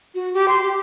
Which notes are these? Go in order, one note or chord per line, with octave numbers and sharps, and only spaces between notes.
F#4
G4
C6
G4